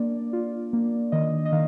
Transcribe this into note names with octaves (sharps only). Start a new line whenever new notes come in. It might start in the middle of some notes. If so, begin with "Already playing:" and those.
Already playing: A#3 D4 D5
F4
A#3
D#3 D#5
D#5
D#3 F5